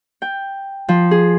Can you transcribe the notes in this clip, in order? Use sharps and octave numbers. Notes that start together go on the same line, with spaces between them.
G5
F3
G#4